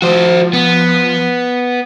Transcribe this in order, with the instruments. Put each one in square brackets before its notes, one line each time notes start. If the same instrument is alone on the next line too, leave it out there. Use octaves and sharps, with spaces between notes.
[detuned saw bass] F3 [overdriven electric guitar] F#4 C5
[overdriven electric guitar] B3